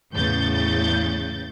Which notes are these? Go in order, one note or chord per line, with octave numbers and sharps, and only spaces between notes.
E2 A2 C#3 G6 A6